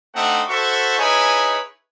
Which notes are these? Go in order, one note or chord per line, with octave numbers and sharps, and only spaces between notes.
A3 C4 D4 D#4 E5 F#5
F#4 A4 C5 E5 C#6
D#4 E4 G#4 B4 C#5 G#5